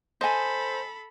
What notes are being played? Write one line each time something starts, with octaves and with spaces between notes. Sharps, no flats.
A4 C5 D#5 G#5 B5